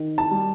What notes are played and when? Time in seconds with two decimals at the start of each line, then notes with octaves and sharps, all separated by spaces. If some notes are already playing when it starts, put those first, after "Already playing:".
Already playing: D#3
0.18 A5
0.31 G3